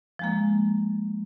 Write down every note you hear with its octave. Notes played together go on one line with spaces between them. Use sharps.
F3 G#3 A#3